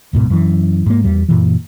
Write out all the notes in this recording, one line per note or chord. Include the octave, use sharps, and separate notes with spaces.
D1 G#2 B2
F#2 E3
G#2 A#3
E2 G3
F#2 A#2 E3